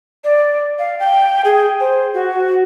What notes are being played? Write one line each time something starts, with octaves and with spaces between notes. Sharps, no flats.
D5
F5
G5
G#4
C5
F#4